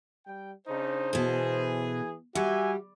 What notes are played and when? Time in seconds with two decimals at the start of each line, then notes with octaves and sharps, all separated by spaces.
0.26 G3 G5
0.67 C#3 D4 D#4 C5
1.13 B2 E3 G#4 A4
2.35 G3 F#4 E5 G#5